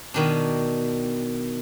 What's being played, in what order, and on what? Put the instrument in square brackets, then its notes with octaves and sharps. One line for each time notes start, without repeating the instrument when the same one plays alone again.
[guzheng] B2 D#3 D4